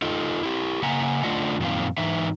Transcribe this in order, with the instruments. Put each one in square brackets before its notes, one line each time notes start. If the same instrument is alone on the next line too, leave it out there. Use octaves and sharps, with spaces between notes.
[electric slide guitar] D#4 F4 A4 D#5
E4 G4
C#3 A#3 E5 F#5 G#5 A#5
D3 A3 D4 F4 D#5 F#5
F#2 A#2 D#3 F3 C4 F5
G#2 E3 D#4 E5